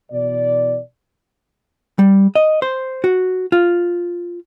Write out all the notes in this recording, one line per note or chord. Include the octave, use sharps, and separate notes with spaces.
B2 E3 D5
G3
D#5
C5
F#4
F4